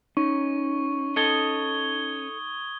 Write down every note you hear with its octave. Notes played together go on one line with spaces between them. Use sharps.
C#4 D#4 C#6
A4 D#5 D#6 G#6 G7